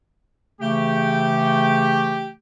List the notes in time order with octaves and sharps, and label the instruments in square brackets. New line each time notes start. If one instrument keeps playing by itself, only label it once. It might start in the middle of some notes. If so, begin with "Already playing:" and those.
[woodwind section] C#3 E3 A3 [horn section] G4